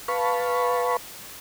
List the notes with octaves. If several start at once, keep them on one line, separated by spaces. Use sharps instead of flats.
B4 F5 A5 B5 C#6